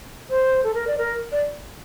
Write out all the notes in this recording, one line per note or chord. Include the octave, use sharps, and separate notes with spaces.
C5
A4
A#4
D5
A#4
D5